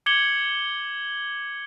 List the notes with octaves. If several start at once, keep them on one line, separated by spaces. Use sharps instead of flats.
D6 G#6 C#7 F#7 G7